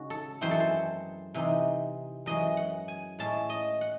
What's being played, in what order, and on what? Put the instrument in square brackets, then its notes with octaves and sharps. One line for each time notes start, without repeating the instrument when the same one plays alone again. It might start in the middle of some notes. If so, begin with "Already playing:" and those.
Already playing: [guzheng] C#3 G#3 D#4 F#4
A4
F#2 E3 G#3 C4 E4 C5
A4
C5
C3 E3 C4 D#4
F#2 E3 G#3 D#5
F#5
G#5
A2 G#3 C#4 E4 A5
D#5
F#5